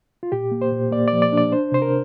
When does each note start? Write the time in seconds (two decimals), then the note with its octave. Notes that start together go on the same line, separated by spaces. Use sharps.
0.23 F4
0.32 A#2 G4
0.51 A#3
0.62 C5
0.72 A#2
0.91 A#3 D5
1.08 D5
1.13 F3
1.22 D5
1.32 D4
1.38 D5
1.52 D4 C5
1.72 C3 C5
1.82 A#4